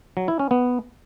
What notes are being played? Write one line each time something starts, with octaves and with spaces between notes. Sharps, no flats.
F#3
E4
C#4
B3